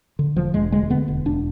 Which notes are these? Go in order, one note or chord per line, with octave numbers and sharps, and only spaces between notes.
D3
E1 F3
E1 G#3
D2 G#3
D3 B3
E1
E1 D4